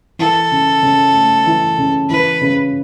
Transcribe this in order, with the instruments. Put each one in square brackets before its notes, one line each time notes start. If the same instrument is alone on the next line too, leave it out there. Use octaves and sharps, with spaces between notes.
[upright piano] E3 [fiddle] A4
[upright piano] C#3
C#3
A3
E3
C#3
[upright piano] E3 [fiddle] B4
[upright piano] C#3